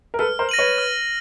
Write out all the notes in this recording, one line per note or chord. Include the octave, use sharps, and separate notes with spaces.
A#4
A4 B4 F6
A#4 C5
A#6 D#7 F#7
B4 C#5
F6